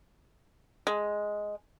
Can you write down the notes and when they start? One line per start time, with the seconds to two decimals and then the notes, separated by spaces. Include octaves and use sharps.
0.87 G#3